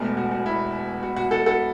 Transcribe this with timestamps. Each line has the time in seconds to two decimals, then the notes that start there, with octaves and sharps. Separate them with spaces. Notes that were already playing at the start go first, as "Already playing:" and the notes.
Already playing: E1 E2 B2 A3
0.17 F#4
0.31 F#4
0.46 E4
1.03 F#4
1.16 F#4
1.31 F#4 A4
1.46 F#4 A4